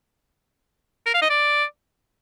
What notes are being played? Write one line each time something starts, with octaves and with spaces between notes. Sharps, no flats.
A#4
F5
D#5
D5